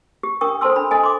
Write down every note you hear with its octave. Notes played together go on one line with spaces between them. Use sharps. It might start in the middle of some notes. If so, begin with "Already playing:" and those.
G4
D4 A#4 G5 C#6 D#6
A4 C5 D5 A5 C6 E6
D4 B5
A4 D#5 G#5
C6 D6